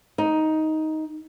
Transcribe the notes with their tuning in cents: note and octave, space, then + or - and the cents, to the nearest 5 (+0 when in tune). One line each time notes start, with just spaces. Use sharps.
D#4 +10